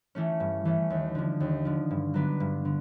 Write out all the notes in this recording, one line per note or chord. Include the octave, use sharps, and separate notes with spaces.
E3 A3 C#4
G2
E3 A3 C#4
D#2
D3 F3
D#2
D3 F3
G2
D3 F#3 B3 D4
G2
D3